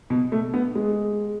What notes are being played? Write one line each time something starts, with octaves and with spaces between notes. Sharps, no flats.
B2
A3
B3
G#3